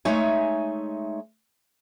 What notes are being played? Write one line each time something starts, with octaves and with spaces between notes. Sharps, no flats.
G#3 A3 D#4 C#5 E5 G#5